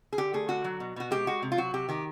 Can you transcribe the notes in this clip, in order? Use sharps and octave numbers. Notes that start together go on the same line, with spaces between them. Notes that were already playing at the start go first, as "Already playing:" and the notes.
G#4
D3 G4
A3 G#4
D3 F#4
F#3
B2
B2 F#4
G#3 G4
G#3 F#4
C3
F4
F#3 F#4
C3 G4
D#3 G4